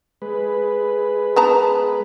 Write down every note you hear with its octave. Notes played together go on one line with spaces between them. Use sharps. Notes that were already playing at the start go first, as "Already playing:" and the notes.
G#3 B4
B3 A5 A#5